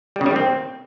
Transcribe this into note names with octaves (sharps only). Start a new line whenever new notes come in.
G3
C#3
G3
D#3
C4